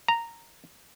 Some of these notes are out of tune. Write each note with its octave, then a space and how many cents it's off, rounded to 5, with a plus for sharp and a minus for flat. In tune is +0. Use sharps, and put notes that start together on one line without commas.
A#5 -10